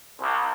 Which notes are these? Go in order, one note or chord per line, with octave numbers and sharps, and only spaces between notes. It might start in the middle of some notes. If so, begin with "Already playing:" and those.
C2